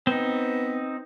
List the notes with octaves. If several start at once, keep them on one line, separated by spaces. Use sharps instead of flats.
B3 C4 D#4